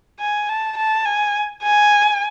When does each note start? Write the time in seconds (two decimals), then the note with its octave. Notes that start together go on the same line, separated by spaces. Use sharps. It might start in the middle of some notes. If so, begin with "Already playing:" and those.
0.20 G#5
0.49 A5
0.77 A5
1.05 G#5
1.63 G#5